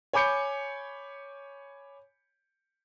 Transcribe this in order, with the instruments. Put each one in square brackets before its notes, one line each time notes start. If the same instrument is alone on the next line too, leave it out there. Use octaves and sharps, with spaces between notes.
[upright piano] C#5 G#5 B5 D6 G6 C#7